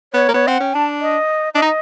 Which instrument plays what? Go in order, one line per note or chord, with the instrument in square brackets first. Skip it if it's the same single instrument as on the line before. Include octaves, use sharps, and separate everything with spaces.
[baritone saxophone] B3 [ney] C#5
[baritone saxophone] A#3
[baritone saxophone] B3 [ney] C#5
[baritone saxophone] C4 [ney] F#5
[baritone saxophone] C#4 [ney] G5
[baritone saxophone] D4 [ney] A5
[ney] D#5
[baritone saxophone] D4 [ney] D#5
[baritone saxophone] D#4